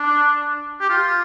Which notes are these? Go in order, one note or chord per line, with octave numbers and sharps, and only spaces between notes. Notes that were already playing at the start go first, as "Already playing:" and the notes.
Already playing: D4
G4
F4